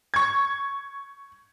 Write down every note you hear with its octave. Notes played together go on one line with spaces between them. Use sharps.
C#6 G#6